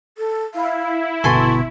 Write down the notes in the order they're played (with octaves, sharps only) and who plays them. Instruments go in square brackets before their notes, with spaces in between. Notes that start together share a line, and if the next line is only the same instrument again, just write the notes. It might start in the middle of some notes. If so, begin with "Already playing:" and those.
[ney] A4
[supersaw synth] E4 [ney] F5
[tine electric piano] G1 B2 B3 [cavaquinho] A4 G#5 C6 [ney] C#6